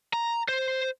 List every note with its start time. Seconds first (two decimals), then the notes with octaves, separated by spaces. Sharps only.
0.14 A#5
0.49 C5